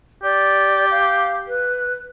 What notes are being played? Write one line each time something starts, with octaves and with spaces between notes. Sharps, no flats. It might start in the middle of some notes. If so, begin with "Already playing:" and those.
G4 D5
F5
B4